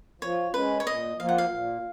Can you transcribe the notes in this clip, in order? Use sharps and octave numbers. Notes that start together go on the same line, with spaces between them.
F3 C#5
G#3 C#4 B4
C#5
A#2 D#5
F3 A#3 F4 F5
F#5
F5
A#2